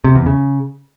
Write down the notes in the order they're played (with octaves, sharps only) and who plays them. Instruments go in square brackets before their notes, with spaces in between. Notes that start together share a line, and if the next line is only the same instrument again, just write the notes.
[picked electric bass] C3
E2
C#3